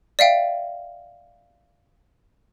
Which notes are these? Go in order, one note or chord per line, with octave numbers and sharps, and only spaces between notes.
D5 E5 F5 G5